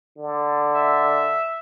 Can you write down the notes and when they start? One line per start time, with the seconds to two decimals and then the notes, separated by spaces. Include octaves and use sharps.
0.18 D3
0.75 E5